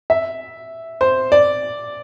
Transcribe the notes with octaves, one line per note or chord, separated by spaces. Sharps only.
E5
C5
D5